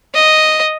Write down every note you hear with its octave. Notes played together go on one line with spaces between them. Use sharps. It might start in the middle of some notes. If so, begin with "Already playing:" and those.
D#5